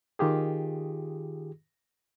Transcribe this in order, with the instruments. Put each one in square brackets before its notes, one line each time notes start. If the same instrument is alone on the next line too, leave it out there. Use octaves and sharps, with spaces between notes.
[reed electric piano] D#3 F4 G4 G#4